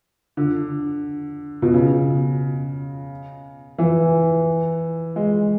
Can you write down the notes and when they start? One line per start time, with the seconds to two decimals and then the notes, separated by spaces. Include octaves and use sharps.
0.37 D3
1.62 B2
1.74 C#3
3.78 E3
5.16 G#3